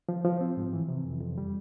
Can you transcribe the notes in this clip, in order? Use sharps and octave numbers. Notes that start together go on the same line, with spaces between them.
F3
F3
C4
G#2
E3
C3
F2
F2
G3